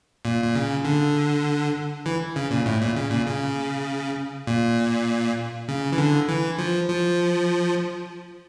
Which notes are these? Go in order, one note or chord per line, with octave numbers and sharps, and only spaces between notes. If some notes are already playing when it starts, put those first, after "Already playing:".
A#2
A#2
C#3
D3
E3
C#3
A#2
A2
A#2
C#3
A#2
C#3
A#2
C#3
E3
D3
E3
F3
F3